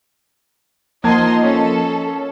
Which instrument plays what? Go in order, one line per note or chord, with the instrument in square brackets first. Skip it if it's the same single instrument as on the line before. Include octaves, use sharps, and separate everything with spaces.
[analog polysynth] F3 A#3 [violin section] D#4 D#5 C6 [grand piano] F#5 A5 G#6
[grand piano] C#4 [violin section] A4